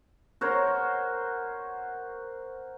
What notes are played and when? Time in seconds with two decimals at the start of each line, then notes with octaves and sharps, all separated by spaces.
0.41 F#4 A#4 C5 C#5